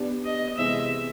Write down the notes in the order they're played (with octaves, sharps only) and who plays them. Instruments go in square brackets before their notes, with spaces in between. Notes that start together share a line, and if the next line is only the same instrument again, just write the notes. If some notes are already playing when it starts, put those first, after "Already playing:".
Already playing: [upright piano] B3 D4 G4
[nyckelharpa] D#5
[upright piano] C3 E3 G#3 B3 [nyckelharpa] E5